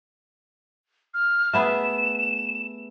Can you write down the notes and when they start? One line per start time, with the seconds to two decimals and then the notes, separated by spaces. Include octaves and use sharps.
1.14 F6
1.53 A3 B3 G#4 E7